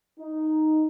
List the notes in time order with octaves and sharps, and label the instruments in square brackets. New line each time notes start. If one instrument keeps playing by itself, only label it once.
[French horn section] D#4